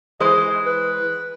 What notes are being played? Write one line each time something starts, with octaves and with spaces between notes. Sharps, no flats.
E3 G#3 C5 D#5
B4